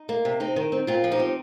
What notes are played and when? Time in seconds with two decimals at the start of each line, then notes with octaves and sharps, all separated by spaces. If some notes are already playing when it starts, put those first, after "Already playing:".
Already playing: D#4
0.09 A#3
0.25 C3
0.40 C4 D#4
0.56 D#3
0.72 C4
0.87 A#2 C4 F4
1.04 F3
1.11 D#4 G4
1.19 C4